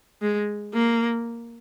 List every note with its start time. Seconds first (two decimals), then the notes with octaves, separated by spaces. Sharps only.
0.21 G#3
0.74 A#3